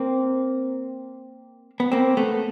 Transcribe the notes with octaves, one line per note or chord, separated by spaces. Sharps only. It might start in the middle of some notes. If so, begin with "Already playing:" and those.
Already playing: A#3 C4
B3
A#3 C4
A3 B3